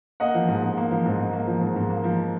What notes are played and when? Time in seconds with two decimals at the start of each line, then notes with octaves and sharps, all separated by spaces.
0.20 A#3 D#5 F#5
0.35 F3
0.48 G#2
0.63 G#2
0.77 A#3
0.91 F3
1.06 G#2
1.19 G#2
1.33 A#3
1.47 F3
1.61 G#2
1.76 G#2
1.90 A#3
2.04 F3